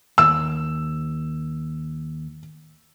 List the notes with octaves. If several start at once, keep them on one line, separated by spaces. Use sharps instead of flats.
D#2 E6